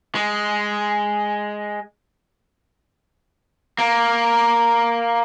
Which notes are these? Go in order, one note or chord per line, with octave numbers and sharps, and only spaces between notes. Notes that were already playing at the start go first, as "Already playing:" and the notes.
G#3
A#3